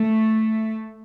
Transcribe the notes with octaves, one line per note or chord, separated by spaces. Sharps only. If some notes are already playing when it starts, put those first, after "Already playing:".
Already playing: A3